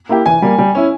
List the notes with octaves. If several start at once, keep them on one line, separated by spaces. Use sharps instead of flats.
A#3 E4 G4
E3 G#5
G3 A#3
G3
C#4 E4